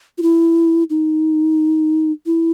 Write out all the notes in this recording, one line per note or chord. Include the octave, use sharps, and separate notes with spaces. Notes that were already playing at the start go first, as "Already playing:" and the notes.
F4
E4
D#4
E4